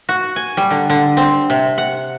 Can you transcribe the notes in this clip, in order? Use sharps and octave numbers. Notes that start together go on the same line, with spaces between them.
F#4
G#5
G3
D3
D3
C4
C3
F#5